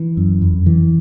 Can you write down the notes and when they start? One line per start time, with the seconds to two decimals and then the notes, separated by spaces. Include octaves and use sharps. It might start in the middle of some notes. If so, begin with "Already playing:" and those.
Already playing: E3
0.17 F#2
0.42 F2
0.66 E3